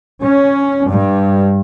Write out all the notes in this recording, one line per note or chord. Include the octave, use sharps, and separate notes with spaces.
C#4
G2